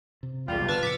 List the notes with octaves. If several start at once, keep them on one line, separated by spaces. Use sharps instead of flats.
C3
B1 E2 C3 G3 F4
G2 D3 B3 B4 A5 E6 F6
A#2 C#3 F3 D6 E6 B6 C#7